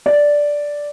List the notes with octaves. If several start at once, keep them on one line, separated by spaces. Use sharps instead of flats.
D5